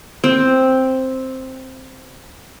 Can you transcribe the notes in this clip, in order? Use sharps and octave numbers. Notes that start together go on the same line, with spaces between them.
C4 G5